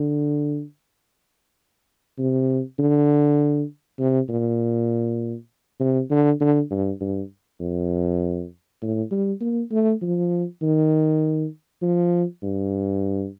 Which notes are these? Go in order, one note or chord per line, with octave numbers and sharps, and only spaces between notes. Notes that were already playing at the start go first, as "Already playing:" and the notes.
Already playing: D3
C3
D3
C3
A#2
C3
D3
D3
G2
G2
F2
A2
G3
A#3
A3
F3
D#3
F3
G2